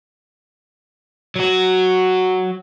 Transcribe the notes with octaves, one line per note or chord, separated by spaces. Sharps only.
F#3 F#4